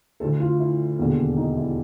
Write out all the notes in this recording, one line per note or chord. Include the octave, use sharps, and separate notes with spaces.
D2 D3 A4
F4
E4
E1 D#2 D3
D#4
E4